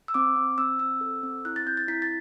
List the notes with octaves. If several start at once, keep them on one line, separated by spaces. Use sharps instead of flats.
E6
C4 D6
C4
C4 E6
C4 E6
A4
C4
E4 F#6
A6
C4 G6
A6
E4 B6
A6